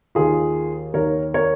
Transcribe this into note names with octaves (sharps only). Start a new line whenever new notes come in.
D#2 D#3 F4 G#4
D#2 D#3 A#4 C#5
A#4 C#5